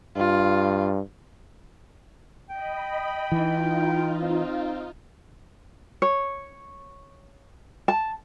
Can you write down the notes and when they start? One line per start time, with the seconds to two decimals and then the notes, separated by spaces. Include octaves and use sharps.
0.17 G2 F4
2.50 D#5 G5 B5
3.32 E3 D#4 F4
4.21 C4
6.02 C#5
7.88 A5